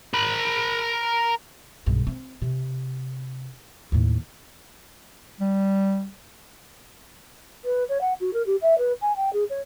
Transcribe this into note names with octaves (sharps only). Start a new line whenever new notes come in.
A#4 B5
B1 G2
C4
C3
D#2 A2
G3
B4
C#5
F#5
F#4
A#4
G4
E5
B4
G#5
G5
G#4
C#5